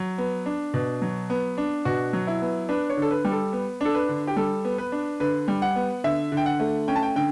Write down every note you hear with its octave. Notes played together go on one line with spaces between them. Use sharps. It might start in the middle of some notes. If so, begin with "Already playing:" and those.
Already playing: F#3
B3
D4
B2
F#3
B3
D4
B2 F#4
F#3
E4
B3
D4 B4
C#5
D3 A4
B4
G3
A4
B3
D4 A4
B4
D3
G4
G3 A4
B3
B4
D4
D3 B4
G3
F#5
B3
D3 E5
D3
G5
F#5
A3
C#4 G5
A5
G5
D3 G5